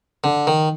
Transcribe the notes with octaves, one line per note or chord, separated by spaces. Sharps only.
D3
D#3